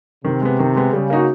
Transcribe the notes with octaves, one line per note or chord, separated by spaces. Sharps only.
C3 D#3
G#3 B3
D#3
G#3 B3
C#3 G3
A#3 D#4 F#4